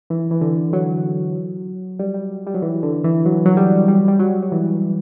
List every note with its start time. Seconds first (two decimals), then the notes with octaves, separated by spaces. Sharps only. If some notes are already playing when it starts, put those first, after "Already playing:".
0.10 E3
0.31 E3
0.41 D3
0.73 F#3
1.99 G3
2.14 G3
2.47 G3
2.55 F#3
2.62 E3
2.83 D3
3.04 E3
3.26 F#3
3.45 F#3
3.57 G3
3.88 G3
4.08 G3
4.19 F#3
4.43 F#3
4.52 E3